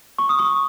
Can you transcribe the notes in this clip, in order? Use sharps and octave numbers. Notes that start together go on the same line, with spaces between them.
C#6
D#6
C#6